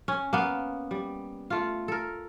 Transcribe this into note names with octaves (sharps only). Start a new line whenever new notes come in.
C#4
A#3 B3
G3
A3 F4
A4 A#4